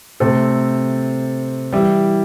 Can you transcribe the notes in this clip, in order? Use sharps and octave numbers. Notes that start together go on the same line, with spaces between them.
C3 A3 C4 A4
E3 G3 E4 G4